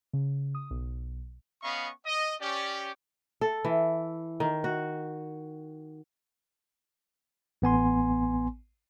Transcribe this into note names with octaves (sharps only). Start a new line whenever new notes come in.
C#3
D#6
B1
B3 C#4 D#5 F5 B5 C#6
D#5
C#4 G4 D5
A4
E3
D#3
F#4
A1 B3 G#5 C6